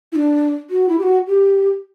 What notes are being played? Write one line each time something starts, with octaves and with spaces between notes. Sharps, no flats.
E4
D4
F#4
E4
G4
F#4
G4